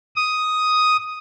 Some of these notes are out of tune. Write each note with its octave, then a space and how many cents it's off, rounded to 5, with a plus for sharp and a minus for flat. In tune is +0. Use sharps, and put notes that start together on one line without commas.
D#6 +5